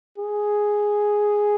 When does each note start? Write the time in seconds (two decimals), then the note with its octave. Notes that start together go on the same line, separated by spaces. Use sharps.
0.18 G#4